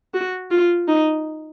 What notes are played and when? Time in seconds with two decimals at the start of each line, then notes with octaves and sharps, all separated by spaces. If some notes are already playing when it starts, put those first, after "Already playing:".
0.14 F#4
0.51 F4
0.88 D#4